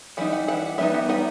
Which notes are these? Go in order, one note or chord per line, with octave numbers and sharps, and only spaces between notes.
E3 G3 D#4 F#5
F#5
E3 G3 F#5
G3 B3 D#4 E5
F#5
G3 B3 D#4 F#5